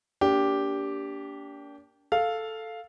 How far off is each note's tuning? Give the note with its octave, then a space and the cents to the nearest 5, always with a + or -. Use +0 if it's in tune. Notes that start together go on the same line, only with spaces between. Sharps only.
A#3 +0 D4 -35 G4 +0
A4 +0 F5 +0